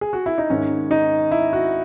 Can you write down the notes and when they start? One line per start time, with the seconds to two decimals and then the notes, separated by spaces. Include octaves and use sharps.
0.01 G#4
0.13 F#4
0.26 E4
0.38 D#4
0.50 G#2 D#3 G#3 C#4
0.91 D#4
1.31 E4
1.53 F#4